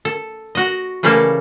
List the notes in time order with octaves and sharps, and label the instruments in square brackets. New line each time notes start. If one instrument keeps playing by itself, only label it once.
[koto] A4
F#4 D#5
C#3 E3 G3 A3 A#3 A4